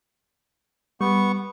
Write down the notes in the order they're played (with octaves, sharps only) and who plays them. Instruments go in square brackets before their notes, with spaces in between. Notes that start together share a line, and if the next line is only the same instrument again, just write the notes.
[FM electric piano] G3 [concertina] B3 C#6